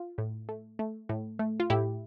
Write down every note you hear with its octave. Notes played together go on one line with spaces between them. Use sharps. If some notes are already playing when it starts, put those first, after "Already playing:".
Already playing: F4
A2
A3
A3
A2
A3
F4
A2 E4 G4